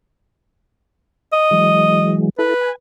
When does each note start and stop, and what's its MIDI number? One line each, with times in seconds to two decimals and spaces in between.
1.33 2.16 75
1.51 2.29 52
1.51 2.29 54
1.51 2.29 56
2.38 2.54 64
2.38 2.54 69
2.38 2.70 71
2.61 2.75 80